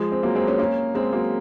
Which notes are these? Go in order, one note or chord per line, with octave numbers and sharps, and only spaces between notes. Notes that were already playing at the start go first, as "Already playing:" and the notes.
Already playing: F3 G#3
C4
F#3 A#3
G#3 C4
A#3 C#4
A#3 C#4
G#3 C4
F#3 A#3